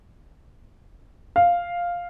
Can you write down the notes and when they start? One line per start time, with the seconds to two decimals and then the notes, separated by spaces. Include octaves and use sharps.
1.36 F5